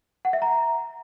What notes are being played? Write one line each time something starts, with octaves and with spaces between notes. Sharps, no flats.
F#5
E5
A#5